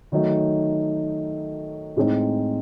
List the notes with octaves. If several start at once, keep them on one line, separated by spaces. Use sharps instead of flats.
D#3 F#3 A3 D#4 A4
A2 G#3 C4 D#4